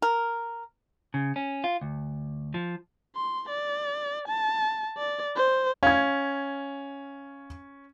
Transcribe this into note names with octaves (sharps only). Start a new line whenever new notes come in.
A#4
C#3
C#4
F4
D2
F3
C6
D5
A5
D5
C5
C#4 F5 G#6